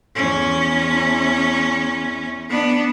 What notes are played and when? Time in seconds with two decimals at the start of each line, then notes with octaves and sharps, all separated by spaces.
0.16 E2 C#4
2.49 B3 D4